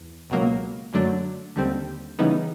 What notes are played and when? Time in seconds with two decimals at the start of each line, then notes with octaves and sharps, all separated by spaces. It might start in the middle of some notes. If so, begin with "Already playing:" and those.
Already playing: E2
0.30 C#2 B2 F#3 A#3
0.93 F#2 D3 F#3 A3 D4
1.56 D#2 D3 G3 C4
2.19 C#3 E3 G3 B3 D#4